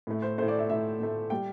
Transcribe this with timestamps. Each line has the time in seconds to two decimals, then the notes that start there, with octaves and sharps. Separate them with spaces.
0.07 A2 A3
0.22 C5
0.38 A2 A3 C5
0.48 D5
0.59 E5
0.69 A2 A3 E5
1.00 A2 A3
1.30 G3 G5